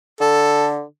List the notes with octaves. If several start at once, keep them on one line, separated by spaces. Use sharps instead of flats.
D3 A4